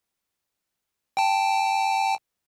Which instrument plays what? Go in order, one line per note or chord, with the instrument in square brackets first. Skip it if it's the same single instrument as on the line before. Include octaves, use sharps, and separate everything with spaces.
[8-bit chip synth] G5 A5